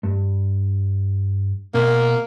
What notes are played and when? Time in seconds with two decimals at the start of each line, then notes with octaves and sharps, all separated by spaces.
0.03 G2
1.74 B2 A#3